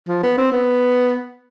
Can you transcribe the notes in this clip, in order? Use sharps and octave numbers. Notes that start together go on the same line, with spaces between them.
F3
B3
C4
B3